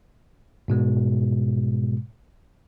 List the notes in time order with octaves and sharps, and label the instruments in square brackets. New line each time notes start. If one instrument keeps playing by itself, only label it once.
[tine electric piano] G#2 B2 G#3